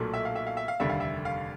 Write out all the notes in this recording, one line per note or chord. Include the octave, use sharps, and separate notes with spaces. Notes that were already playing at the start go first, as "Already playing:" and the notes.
Already playing: B1 A#2 F#3 A3
E5
F5
E5
F5
E5
F5
F1 D#2 D3 G3 E5
F5
E5
F5